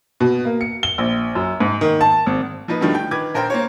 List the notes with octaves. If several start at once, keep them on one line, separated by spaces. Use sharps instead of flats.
B2
A#3
C#7
G7
A#1
F#2
G#2
D#3
A5
G#1
F3 A#3 D#4 B4
G2 B2 D3 D#3 F3 A3
G5
D#3 B4 D6 G#6
A#1 A#4 C5 G5
A#3 C5 C#5